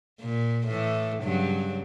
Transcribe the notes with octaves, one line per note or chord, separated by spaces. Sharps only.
A#2
A2 E3 A3
G2 C#3 F#3